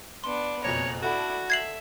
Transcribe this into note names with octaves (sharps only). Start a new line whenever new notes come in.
B3 D4 C6
F#1 F2 B2 C#5 A#5
D4 E4 F#4 A4 F#5 A5
E5 G#6 C7 F#7